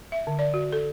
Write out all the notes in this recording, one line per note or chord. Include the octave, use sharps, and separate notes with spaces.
E5
D3
D5
F#4
A4